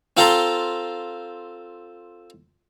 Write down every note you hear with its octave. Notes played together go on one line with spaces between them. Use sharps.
C4 F4 A4 C5 A#5 C6